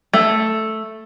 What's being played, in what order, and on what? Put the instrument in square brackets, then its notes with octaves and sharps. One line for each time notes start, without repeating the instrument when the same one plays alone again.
[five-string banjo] A3